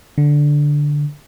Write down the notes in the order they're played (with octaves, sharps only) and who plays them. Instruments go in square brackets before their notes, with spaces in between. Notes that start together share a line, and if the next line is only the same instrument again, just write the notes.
[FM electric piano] D3